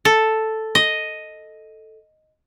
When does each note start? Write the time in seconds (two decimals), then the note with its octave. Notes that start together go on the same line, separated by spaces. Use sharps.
0.05 A4
0.75 D#5